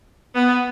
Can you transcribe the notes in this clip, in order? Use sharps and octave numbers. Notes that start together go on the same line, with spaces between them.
B3